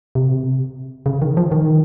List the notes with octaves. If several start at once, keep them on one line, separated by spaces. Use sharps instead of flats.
C3
C#3
D#3
F3
D#3